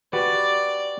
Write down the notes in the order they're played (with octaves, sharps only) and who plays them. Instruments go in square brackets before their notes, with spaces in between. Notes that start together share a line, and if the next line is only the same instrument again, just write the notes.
[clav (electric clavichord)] F#4 G4 B4 [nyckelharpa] D5